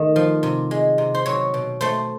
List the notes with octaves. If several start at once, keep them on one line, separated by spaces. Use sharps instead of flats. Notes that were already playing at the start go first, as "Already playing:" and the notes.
Already playing: D#3 A3
F3
C3
G#3
C3
C5
F#3 C#5
B2
A3 C5